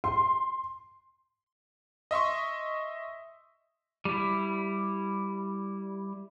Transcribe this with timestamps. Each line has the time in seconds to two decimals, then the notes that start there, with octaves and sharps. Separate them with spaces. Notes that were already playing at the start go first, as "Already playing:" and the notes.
0.04 C6
2.11 D#5 E5 C6 C#6
4.05 G3 E4